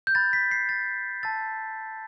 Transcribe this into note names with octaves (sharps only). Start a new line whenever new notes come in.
G6
B5 F#6 A6
B6
C7
A6
A5 E6 G6 A6